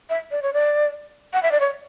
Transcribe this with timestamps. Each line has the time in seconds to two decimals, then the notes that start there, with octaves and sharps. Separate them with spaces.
0.10 E5
0.31 D5
0.42 C#5
0.53 D5
1.33 F#5
1.43 E5
1.52 D5
1.60 C#5